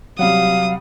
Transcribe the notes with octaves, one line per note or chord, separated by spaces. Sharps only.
C3 F#3 G3 F5 F#5 D#6